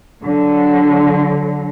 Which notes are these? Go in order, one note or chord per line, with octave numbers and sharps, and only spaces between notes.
D3 F#3